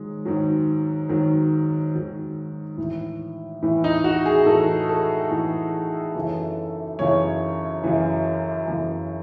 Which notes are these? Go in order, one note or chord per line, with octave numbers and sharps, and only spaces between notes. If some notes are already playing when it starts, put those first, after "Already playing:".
Already playing: G#2 D#3 F#3 G#3
G#2 D#3 F#3
G#2 D#3 F#3
G#2 D#3 F#3
A2 E3
A2 E3
D#4
F#4
G#4
A2 E3 A4
A4
A2 E3
F#2 C#3 E3
F#2 C#3 E3 C#5
F#2 C#3 E3
F#2 C#3 E3